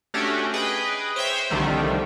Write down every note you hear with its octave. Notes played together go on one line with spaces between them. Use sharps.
A3 C#4 D4 F#4 G4
G#4 B4 D#5 G5
C5 C#5 E5 G5
C2 D3 D#3 F3 G3 A3